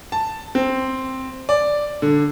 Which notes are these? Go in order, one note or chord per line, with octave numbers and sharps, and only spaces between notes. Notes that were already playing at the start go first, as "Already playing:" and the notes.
A5
C4
D5
D3